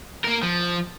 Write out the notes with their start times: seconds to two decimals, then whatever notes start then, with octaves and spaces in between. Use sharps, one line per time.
0.24 A#3 A#4
0.43 F3